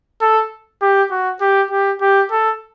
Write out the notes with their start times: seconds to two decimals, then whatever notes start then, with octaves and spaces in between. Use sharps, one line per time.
0.21 A4
0.82 G4
1.11 F#4
1.41 G4
1.71 G4
2.01 G4
2.31 A4